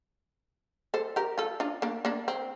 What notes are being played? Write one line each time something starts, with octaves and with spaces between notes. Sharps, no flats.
A4 C5
G4 A#4
F4 A4
D4 F4
A#3 D4
A#3 D4
C4